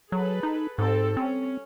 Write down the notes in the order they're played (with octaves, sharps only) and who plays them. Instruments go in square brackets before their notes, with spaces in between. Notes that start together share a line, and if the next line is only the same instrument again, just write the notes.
[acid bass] F#3 [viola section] G#4 A4 B4
[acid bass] D#4
[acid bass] G#2 [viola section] G3 C4 A4
[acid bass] C4 [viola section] C#4